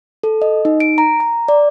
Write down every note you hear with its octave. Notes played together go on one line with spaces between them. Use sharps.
A4
D#5
D#4
D7
A#5
A#5
D5